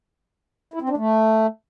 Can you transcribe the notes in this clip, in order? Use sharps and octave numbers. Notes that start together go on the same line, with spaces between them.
E4
C4
D4
A3